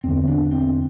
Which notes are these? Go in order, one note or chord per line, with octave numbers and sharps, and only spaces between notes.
E2 D3 C4
D4
C4